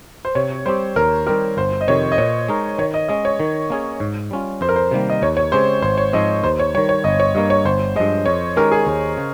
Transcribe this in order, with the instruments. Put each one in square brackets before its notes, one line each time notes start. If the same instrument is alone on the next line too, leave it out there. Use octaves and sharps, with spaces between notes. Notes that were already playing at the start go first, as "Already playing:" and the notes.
[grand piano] C5
[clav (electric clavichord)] C3 [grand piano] C#5
[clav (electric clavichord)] G3 C4 G4 [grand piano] C5
[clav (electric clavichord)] D#2 [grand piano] A#4
[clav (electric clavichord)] D#3 G3 C4 G4 [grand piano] A#4
[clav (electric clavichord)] G1 [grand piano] C5
[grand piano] D#5
[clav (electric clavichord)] F2 C3 D#3 [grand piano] C#5
[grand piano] D#5
[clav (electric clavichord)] A#2 [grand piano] C#5
[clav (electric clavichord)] G#3 D#4 A#4
[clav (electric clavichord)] D#3 [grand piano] C#5
[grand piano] D#5
[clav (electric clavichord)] G#3 C#4 [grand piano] D#5
[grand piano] C#5
[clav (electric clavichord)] D#3
A#3 C#4 G#4
G#2
G3 C#4 F4
[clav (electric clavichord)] F2 [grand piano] C5
[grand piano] A#4
C5
[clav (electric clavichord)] C3 D#3 G3 A#3
[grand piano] D#5
[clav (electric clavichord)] D#2 [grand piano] C#5
[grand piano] C#5
[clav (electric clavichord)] C#3 G#3 C4 G4 [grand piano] C5
[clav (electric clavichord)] G#1 [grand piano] C5
[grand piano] C#5
[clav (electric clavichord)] G#2 F3 C4 [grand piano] D#5
[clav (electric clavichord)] D#2 [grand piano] C5
[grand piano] C#5
[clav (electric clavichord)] G3 [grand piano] C#5
[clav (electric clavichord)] D#3
[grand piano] C#5
[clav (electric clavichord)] G1 [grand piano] D#5
[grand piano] C#5
[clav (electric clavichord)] G2 G3 A#3 [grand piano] D#5
[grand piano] C#5
[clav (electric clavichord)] G1 [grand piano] C5
[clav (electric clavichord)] G2 F3 G#3 [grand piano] D#5
[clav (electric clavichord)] F2 [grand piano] C#5
[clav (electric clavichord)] D#3 G#3 C#4 G4 [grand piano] A#4
[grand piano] G#4
[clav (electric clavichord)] D#2
C#3